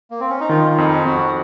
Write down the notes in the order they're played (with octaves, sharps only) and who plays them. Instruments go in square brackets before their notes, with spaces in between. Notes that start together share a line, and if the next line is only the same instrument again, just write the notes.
[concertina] A#3
C4
C#4
D#4
[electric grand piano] D#3 [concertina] F4
[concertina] F4
[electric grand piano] F2 [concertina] D#4
[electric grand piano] F2 [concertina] F#4